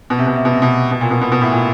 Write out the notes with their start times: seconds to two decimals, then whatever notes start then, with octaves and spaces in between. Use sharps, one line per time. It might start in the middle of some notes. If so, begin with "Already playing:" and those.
0.10 B2
0.19 C3
0.27 B2
0.36 C3
0.45 B2
0.53 C3
0.62 B2
0.91 B2
1.01 A#2
1.11 B2
1.21 B2
1.32 B2
1.41 A2
1.52 A#2